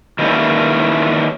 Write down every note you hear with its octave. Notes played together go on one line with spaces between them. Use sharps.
D#3 E3 G3 A#3 C#4 E4